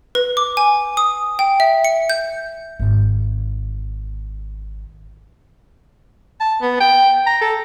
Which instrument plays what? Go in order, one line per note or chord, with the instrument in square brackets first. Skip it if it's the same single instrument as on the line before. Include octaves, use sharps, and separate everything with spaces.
[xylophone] B4
D6
G#5
D#6
G5
E5
C#7
G6
[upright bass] G#1 D#3
[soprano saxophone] A5
B3
G5
A#5
A4